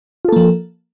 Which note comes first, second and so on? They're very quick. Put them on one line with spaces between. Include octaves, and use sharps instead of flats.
F4 A4 A#3 F3